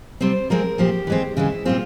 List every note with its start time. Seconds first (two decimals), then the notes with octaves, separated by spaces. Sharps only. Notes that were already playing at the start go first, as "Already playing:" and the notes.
0.21 C3 G3 C4 C5
0.50 F3 G#3 C4 A#4
0.78 A#2 F3 C4 G4
1.07 E3 G#3 C4
1.37 C#3 E3 G#3 E4
1.65 A#2 G3 C4 F4